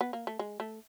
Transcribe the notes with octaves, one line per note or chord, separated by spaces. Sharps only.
B3
A#3
A3
G#3
A3